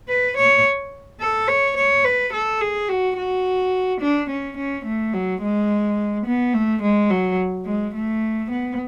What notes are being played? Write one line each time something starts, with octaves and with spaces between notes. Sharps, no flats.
B4
C#5
A4
C#5
C#5
B4
A4
G#4
F#4
F#4
D4
C#4
C#4
A3
F#3
G#3
B3
A3
G#3
F#3
G#3
A3
B3